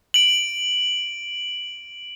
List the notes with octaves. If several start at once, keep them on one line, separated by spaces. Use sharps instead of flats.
D7 F#7